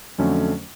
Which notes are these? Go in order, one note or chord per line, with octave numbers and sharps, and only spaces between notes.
F2 D3 F#3 A3 C#4